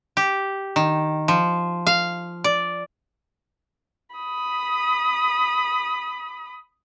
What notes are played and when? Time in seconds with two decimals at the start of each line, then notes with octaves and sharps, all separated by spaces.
0.17 G4
0.76 D#3
1.28 F3
1.87 F5
2.44 D5
4.16 B5 D#6